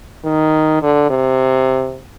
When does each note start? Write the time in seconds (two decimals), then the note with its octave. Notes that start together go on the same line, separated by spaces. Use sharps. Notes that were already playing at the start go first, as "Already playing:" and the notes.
0.25 D#3
0.82 D3
1.10 C3